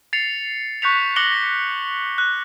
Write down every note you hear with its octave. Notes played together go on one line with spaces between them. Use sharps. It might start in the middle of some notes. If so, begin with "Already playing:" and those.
A6 C7 C#7 F7
C#6 F#6 G6 B6 C#7 F7
D6 F#6 A#6 C#7 F#7 G7
F#6